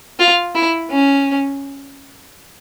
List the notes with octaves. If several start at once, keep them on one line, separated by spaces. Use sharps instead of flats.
F4
E4
C#4